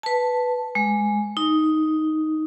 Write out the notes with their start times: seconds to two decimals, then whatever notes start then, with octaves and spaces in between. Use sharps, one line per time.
0.03 B4 A5
0.75 G#3
1.37 D#4